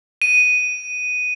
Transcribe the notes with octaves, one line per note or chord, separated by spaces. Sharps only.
D#7